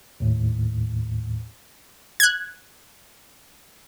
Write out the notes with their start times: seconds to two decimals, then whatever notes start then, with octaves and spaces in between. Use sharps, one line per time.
0.20 D#2 A2
2.20 F#6 G#6